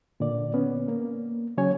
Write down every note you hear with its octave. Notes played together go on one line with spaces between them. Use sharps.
A#2 D3 D5
B3 C#4
A#3
C#3 F#3 C#4 C#5 G#5